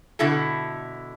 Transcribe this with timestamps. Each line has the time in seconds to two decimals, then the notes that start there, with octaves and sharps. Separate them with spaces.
0.19 B2 D3 E4 A4